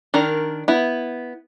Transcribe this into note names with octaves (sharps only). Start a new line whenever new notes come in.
D#3 D4 A#4
B3 E4